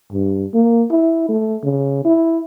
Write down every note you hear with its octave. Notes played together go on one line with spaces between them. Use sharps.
G2
A#3
E4
A3
C#3
E4